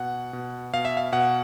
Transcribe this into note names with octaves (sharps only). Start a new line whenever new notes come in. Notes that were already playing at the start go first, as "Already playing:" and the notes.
Already playing: B2 F#5
B2
B2 F5
E5
F5
B2 F#5